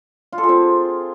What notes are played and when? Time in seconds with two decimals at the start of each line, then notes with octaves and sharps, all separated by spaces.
0.32 F4
0.38 A4
0.43 G#4
0.49 C4